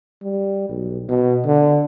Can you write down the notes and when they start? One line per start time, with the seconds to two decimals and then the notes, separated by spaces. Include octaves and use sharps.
0.23 G3
0.69 B1
1.09 B2
1.46 D3